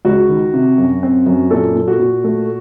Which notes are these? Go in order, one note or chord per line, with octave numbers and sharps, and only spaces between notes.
C#2 F#4
D#3
C3
F#2
C4
F#2
A#2 A4
A#2
F#4
A#2
A3